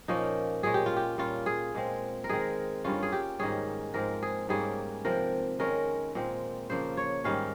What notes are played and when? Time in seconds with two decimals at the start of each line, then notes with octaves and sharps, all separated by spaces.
0.08 A#2 F3 A#3 C#4 D#4
0.63 A#2 G#3 C#4 G#4
0.74 G4
0.86 F4
0.97 G4
1.18 A#2 G3 C#4 F4
1.46 G#4
1.75 A#2 G#3 C4
2.24 A#4
2.29 D#3 G#3 C4 G#4
2.84 G2 G3 A#3 C#4 F4
3.03 G#4
3.12 G4
3.39 G#2 D#3 G3 C#4 G#4
3.94 G#2 F3 G#3 C4 A#4
4.23 G#4
4.49 G#2 G3 A#3 C#4 G#4
5.05 C3 F3 C4 A#4
5.59 D#3 G#3 C#4 A#4
6.15 A#2 G#3 C4
6.70 C#3 F3 A#3 C5
6.97 C#5
7.24 G#2 D#3 G3 C#4 F5